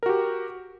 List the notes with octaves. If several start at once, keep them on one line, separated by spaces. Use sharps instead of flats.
F#4 G4 A#4